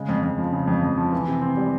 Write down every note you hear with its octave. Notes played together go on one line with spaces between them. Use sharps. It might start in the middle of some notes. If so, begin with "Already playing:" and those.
Already playing: C#3 G#3
F2
F2
F3
C#3
F2
F2
F3
E3
C3
C4
G3